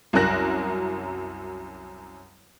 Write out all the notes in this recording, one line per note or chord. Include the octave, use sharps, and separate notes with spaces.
C2 F#2 F#3 A#4 F#6 A#6